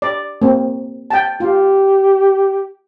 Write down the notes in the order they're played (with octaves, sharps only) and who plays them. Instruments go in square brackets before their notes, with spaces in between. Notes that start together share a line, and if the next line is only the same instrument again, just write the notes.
[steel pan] D5
A#3 C4
G5 A5
[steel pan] F4 [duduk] G4